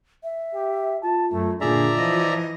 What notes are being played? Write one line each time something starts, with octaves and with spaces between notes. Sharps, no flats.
E5
G4
F4 A5
F#2 A3
A#2 D3 F4 G#4 D5 E5 A#5
E3 F3 D#5